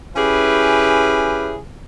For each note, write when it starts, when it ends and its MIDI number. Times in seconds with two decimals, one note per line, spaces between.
0.16 1.57 61
0.16 1.57 64
0.16 1.57 67
0.16 1.57 68
0.16 1.57 71